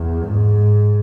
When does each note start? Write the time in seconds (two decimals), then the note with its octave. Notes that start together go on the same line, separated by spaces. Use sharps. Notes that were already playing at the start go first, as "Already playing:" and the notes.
Already playing: E2
0.25 G#2